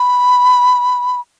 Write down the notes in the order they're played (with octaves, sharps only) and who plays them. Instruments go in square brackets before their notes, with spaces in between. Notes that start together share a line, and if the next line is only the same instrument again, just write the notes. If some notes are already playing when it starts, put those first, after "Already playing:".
Already playing: [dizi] B5